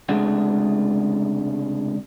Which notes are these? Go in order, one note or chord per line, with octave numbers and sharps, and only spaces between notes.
C#2 C3 G#3 A3 D4 F#5